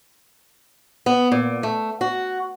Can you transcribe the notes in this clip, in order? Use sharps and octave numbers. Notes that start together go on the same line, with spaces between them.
B3
A#2
A3
F#4